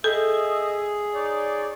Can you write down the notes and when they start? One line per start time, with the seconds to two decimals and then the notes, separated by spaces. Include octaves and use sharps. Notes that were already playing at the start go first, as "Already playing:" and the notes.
0.04 G#4 A4 D#5 E5
1.14 D#4 C#5 D5